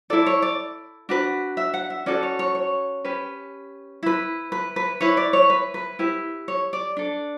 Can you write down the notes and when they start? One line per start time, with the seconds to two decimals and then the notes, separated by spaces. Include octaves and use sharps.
0.10 E4 A4 D5
0.26 C#5
0.42 D5
1.09 D4 F#4 B4
1.57 E5
1.74 F#5
1.90 E5
2.06 C#4 F#4 A4 D5
2.23 C#5
2.39 C#5
2.55 C#5
3.05 C#4 G4 B4
4.03 E4 B4
4.52 B4
4.76 B4
5.01 E4 B4 C#5
5.17 D5
5.33 C#5
5.50 B4
5.74 B4
5.99 E4 G4 B4
6.48 C#5
6.73 D5
6.97 D4 A4